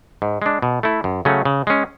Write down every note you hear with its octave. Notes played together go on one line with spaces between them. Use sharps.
G#2
G#3 D4
B2
A3 E4
F#2
C#3 F#3 A3 C#4
C#3
G#3 C#4